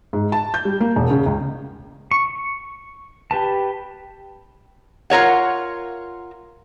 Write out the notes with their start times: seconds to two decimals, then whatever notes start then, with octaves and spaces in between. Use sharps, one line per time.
0.13 G#2
0.32 A5
0.54 G6
0.65 G3
0.80 A#3
0.96 E1
1.11 C#3
1.26 C#2
2.11 C#6
3.31 G4 B4 A5
5.10 F4 A#4 C#5 F#5